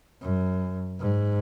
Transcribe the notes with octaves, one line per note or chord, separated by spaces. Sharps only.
F#2
G#2